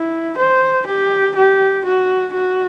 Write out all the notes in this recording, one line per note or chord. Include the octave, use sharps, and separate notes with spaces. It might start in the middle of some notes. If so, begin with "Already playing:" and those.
Already playing: E4
C5
G4
G4
F#4
F#4